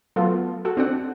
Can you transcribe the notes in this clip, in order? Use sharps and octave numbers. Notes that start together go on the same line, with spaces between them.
F#3 A3 B3 F4 A4
F#4 A4
C4 D4 F#5